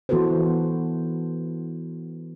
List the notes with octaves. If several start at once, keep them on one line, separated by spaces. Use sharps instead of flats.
E3 B3 F#4 A4 B4 C5